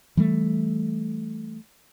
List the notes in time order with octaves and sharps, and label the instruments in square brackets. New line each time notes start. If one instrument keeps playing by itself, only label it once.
[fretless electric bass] E3 G3 A3